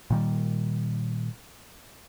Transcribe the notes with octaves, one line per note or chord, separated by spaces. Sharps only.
A#2 D#3 G3